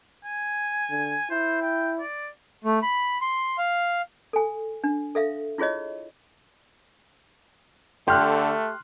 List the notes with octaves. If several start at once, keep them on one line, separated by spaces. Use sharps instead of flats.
G#5
D3
E4 C5
G5
D5
A3
B5
C6
F5
A4 G#5
D4
A4 E5 F5
E4 F4 G#4 C#5 D#5
D3 A3 G4 C6 F6 F#6